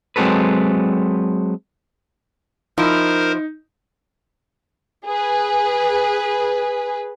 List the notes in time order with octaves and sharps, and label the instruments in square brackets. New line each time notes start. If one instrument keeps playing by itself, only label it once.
[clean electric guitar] F#3 G#3 C4 F#4 A4 B4
[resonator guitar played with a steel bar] F3 E4 [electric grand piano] D#4 [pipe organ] A#4 C5
[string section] G#4 B4